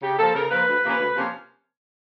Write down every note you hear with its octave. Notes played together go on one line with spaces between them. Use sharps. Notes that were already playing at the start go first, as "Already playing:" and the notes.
C#3 G4
F3 A#3 A4
C#3 A#4
F3 A#3 B4
D2
C3 F3 A#3 C#4
D2
C3 F3 A#3 C#4